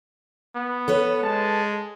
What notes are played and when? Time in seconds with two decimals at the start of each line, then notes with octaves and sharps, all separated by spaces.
0.55 B3
0.88 A4 B4 C#5
1.23 G#3 A5